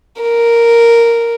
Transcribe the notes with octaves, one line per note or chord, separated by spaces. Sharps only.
A#4